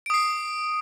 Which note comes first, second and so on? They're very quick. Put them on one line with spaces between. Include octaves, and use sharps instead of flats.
D7 D#6 C7